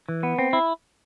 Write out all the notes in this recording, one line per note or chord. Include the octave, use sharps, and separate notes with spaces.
E3
B3
C4
E4